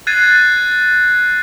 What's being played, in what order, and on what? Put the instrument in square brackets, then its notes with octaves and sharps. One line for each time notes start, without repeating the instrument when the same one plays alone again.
[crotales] F#6 G#6 A6 C7 D#7